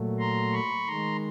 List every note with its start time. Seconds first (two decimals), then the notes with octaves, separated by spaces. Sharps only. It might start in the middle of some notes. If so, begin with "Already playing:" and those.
Already playing: A#2 F#3 A3
0.19 A#5 C6
0.53 B5 C#6
0.87 D#3 G#3 A#5 C6